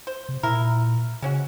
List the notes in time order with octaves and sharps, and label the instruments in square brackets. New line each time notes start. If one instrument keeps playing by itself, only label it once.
[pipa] C5
[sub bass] C3
[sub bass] A#2 [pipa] E4 A#4
[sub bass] C#3 [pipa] G#3 C#4 F#4